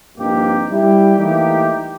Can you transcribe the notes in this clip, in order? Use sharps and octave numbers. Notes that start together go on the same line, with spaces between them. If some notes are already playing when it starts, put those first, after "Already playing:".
A#1 G2 A#3 C4 D#4 G4
G3 E4 G4
E3 A3 A#3 D#4 E4 G4